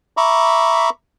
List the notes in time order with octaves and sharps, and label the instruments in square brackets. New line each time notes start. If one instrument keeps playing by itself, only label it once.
[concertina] E5 A#5 B5 C#6 D6